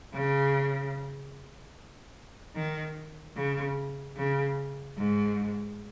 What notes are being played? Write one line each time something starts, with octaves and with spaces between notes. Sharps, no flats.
C#3
D#3
C#3
C#3
G#2